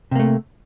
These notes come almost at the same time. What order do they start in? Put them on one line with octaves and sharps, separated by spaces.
C3 A#3 A3